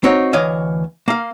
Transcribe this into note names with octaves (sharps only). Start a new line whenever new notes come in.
C4 D#4 F#4 C#5
D2 E3 C#5 D#5 F5
A#3 F5